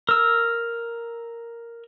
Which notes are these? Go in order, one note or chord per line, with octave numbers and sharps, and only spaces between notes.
A#4 E6